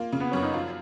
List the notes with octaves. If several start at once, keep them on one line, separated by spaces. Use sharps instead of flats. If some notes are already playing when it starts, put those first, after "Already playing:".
Already playing: A#3 F4
C#3
B3
F#2 C#4
D#4
F3 F4